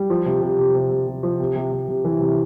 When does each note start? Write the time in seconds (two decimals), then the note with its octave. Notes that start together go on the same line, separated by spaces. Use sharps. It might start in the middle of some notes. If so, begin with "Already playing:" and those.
Already playing: G3
0.10 F3
0.26 C3
0.42 C3
0.58 C3
0.75 C3
0.91 C3
1.07 C3
1.23 F3
1.40 C3
1.56 C3
1.72 C3
1.88 C3
2.05 E3
2.21 C3